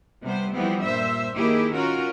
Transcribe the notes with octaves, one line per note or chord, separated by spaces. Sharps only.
C3 G3 B3 C5
E3 F3 G3 B3 C4
G2 A#2 C5 E5
D#3 A#3 E4 G4 G#4
C#4 F4 F#4 A#4